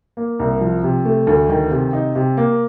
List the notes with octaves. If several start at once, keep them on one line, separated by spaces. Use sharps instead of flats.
A#3
C2
F3
C3
A3
D2
D#3
C3
D#4
C3
A#3